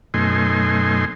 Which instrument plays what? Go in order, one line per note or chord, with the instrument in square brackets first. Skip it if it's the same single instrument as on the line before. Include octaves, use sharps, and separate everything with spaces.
[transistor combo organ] F#2 B2 A3 D#4 G#5 C6